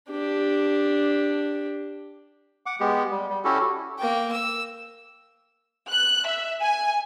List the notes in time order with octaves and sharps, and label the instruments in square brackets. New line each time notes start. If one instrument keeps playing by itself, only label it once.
[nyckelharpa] D4 G4
[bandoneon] F#5 D6
G#3 B3 G4
G3
G3
C#4 E4 F#4 G4 A4
[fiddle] A#3 G5
E6
[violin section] F#6
E5
G#5